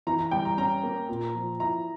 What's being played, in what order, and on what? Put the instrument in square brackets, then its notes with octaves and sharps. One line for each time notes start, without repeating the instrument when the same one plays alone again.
[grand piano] E3 [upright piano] A#5
[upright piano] A#5
[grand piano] G3 [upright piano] G5
[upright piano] A#5
[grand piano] C#4 [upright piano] A#5
[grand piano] A#3
A#2
F3
[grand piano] E4 [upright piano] A#5